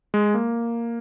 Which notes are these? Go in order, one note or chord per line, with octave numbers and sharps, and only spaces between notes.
G#3
A#3